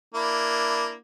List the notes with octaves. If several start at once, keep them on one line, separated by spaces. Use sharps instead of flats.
A#3 D4 E4